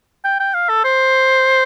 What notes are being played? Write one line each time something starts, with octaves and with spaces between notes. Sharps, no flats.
G5
G5
F5
A4
C5